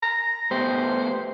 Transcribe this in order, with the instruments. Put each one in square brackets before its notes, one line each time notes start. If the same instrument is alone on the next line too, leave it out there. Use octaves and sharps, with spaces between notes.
[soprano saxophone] A#5
[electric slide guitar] A3 B3 G4 [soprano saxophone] C5